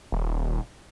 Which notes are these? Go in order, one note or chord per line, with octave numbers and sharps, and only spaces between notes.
D#1